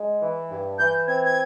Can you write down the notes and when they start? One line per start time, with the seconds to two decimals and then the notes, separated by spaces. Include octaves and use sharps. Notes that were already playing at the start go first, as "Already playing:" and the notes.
Already playing: G#3
0.21 E3
0.50 G2
0.79 E3 G6
1.08 C4 G#6
1.25 G#6